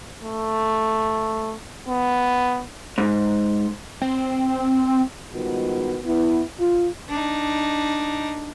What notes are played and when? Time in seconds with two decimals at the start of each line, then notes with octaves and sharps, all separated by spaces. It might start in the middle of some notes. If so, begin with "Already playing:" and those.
0.23 A3
1.88 B3
2.98 G#2
4.02 C4
5.33 G#2 D#3 G3 B3 F4 F#4
6.05 B3 E4
6.59 F4
7.09 D4 D#4